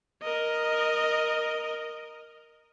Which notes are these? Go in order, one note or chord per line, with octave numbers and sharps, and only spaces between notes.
A#4 D#5